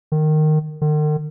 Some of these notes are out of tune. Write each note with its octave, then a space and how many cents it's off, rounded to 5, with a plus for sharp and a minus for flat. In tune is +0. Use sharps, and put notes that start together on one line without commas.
D#3 -15
D#3 -45